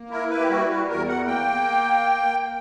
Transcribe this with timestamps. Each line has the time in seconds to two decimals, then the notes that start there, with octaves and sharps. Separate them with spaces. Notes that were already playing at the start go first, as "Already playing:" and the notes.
Already playing: A#3
0.10 E4 A#4
0.30 B4
0.39 G4
0.49 G3 F#4
0.68 F#4
0.88 E2 A#4
1.08 F#5
1.27 A#3 G5